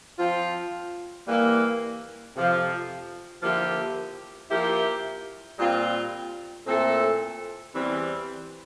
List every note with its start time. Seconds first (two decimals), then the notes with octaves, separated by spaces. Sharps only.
0.18 F3 C4 F4
1.26 E3 G3 A#3
2.35 F2 C3 F3
3.42 D3 F3 A#3 E4 G4
4.51 F3 A#3 E4 G4
5.58 A#2 G3 C4 F4
6.66 A#2 A3 C4 E4 A4
7.75 E2 E3 G3 C4